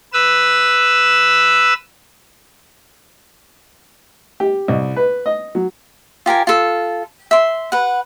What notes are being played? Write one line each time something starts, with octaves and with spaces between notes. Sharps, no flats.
B4 E6
G4
C2
B4
D#5
F#3
F4 G4 A#4 G#5
F4 A4
E5 C6
B4 F#5